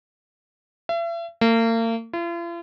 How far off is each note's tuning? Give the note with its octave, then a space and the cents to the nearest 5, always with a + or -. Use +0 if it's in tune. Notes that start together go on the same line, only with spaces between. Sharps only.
E5 +40
A#3 -40
F4 -45